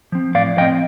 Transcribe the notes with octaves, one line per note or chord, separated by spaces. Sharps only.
F3 C4
A2 D5 F5
F3 C4 D#5 G5